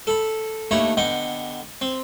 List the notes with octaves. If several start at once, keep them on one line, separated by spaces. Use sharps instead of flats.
A4 B5
D#2 A3 D4 C#5 A#5 B5
D3 B3 D#5 G5
C4